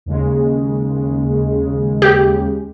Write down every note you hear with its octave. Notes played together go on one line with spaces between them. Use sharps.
D#2 C#3 G#3
G4